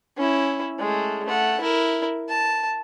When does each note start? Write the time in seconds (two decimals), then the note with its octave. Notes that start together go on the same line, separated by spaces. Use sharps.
0.17 C#4 E4
0.79 G#3 A3
1.25 A3 F#5
1.60 E4 A#4
2.29 A5